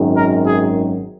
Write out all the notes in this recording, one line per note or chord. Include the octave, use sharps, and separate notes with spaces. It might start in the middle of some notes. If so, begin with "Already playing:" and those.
Already playing: G#1 F#2 D#3 G#3
A#4
G#4